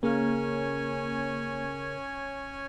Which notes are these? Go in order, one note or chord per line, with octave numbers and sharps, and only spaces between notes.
C#3 A#3 C#4 A#4 C#5 G#5